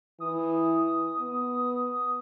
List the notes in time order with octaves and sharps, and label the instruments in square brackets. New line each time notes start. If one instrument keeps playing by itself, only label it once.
[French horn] E3 [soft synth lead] D#6
[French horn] B3